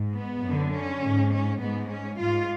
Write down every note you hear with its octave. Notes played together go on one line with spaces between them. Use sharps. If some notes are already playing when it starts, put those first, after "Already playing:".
Already playing: G#2
B3
F#2 D3
C#4
G#2
C#4
G#2 B3
C#4
G#2 F4